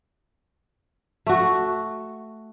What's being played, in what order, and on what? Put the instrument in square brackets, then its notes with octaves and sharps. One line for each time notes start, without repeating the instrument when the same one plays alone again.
[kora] A3 F#4